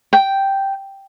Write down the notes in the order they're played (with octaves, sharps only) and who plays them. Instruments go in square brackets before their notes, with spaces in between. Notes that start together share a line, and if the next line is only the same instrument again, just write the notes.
[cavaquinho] G5